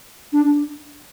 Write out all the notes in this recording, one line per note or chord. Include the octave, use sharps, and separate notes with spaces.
D4